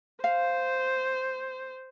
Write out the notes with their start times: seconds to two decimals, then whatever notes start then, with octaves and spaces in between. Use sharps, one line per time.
0.24 C5 F5